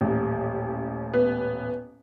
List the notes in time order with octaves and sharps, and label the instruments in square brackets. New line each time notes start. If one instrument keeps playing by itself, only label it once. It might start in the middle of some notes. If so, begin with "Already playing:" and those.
[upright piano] D#1 A1
[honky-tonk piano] B3